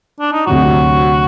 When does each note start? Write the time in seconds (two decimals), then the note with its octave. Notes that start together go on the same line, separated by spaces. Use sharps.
0.20 D4
0.33 D#4
0.46 D2 C3 F#3 F#4